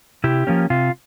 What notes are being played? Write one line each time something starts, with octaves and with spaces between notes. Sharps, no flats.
C3 E4 G4
F3 A#3 C#4
C3 F4